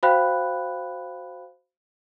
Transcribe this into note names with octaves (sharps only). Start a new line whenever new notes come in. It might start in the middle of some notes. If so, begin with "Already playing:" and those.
F#4 C5 F5 G5 B5 F#6